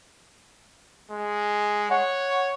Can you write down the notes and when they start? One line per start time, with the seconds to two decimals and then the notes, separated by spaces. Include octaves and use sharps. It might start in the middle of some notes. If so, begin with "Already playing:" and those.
1.11 G#3
1.91 C#5 F#5